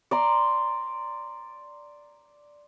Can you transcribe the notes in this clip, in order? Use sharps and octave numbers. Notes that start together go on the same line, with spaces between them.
D5 A#5 C6